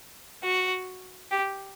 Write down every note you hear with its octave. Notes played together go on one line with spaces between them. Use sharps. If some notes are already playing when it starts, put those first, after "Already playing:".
F#4
G4